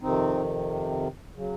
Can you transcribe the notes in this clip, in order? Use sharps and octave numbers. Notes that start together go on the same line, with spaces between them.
F2 C3 D#3 C4 D#4
C#3 F#3